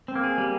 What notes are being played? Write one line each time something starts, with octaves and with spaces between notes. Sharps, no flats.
C4
A#3
G#4
G3